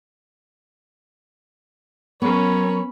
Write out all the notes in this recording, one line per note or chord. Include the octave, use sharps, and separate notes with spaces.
F#3 B3 C#4 A#4 C#5 B5